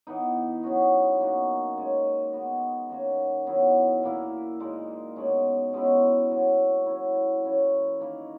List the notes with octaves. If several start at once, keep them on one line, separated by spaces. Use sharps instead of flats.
E3 B3 D#4
F#3 C#4 F#4
B2 A#3 D#4 F#4
A#2 G#3 C#4
D#3 G#3 B3 F#4
D#3 A#3 C#4 F#4
D#3 F#3 B3 E4
A#2 A#3 E4
A#2 G#3 D#4
B2 G#3 C#4
B2 G#3 C#4 E4
A#2 F#3 C#4 F#4
F#3 C#4 E4
E3 A#3 C#4 E4
D#3 A#3 E4